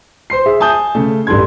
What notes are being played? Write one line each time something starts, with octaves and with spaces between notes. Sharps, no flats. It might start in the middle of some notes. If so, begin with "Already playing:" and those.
C5 C6 C7
G#4 E5
G#5 A5 D#6 G6
C#3 A3
A1 G2 A4 C6 G#6